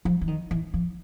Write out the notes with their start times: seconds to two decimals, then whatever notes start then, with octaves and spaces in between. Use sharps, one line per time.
0.05 F3
0.21 E3
0.28 D#3
0.51 E3
0.74 F3